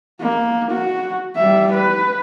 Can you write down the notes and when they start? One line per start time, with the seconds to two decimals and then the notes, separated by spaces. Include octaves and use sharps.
0.21 A#3
0.72 F#4
1.36 G3 E5
1.73 B4